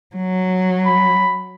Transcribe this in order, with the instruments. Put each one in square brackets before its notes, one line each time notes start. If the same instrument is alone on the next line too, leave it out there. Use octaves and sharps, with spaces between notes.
[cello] F#3
[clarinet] B5